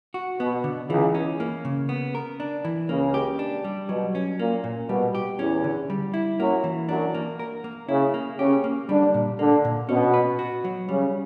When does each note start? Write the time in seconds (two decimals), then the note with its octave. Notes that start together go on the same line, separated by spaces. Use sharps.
0.14 F#4
0.40 B2 B3
0.64 D3
0.89 C#2 C#3 E3
1.15 C#4
1.40 A#3
1.65 C#3
1.89 B3
2.15 A#4
2.40 D4
2.65 E3
2.89 C#2 C#3 A#3
3.14 G4
3.39 D4
3.64 G3
3.89 B2 F#3
4.15 C#4
4.39 A#2 A#3
4.64 A#2
4.89 B2 G3
5.15 G4
5.39 E2 E3 C#4
5.64 D3
5.90 G3
6.14 E4
6.39 F#2 F#3 A#3
6.64 E3
6.89 F#2 F#3 D4
7.14 A#3
7.39 A#4
7.64 A#3
7.89 C#3 C#4 E4
8.14 A#3
8.39 C#3 C#4 G4
8.64 A#3
8.89 D3 G3 D4
9.14 A#2
9.39 D3 A#3 D4
9.65 A#2
9.88 B2 B3 C#4
10.14 B4
10.39 F#4
10.65 F#3
10.89 C#3 G3 C#4